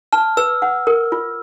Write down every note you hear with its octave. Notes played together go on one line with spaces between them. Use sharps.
A5 F6
B4 E6
F#5
A#4
F4